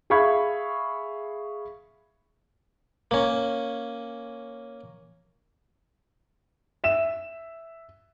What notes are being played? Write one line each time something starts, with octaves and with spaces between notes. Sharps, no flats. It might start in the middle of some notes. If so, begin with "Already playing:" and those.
G#4 E5 F5 B5 C#6 G#6
A#3 C#4
E5 E7